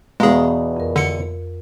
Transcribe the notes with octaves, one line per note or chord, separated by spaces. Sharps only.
E2 B2 G#3 G#4 F5 A#5
F2 A#4
D3 C#7